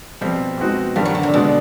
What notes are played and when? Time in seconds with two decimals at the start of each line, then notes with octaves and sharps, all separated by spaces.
0.21 B2 F3 G3 C4
0.58 B2 G#3 C4 D#4 F#4
0.96 G2 D#3 F3 G3
1.05 F#3
1.15 D3
1.23 C3
1.33 B2 D3 G#3 B3